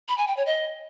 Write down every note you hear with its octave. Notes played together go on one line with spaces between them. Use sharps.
B5
G#5
G5
C#5
D#5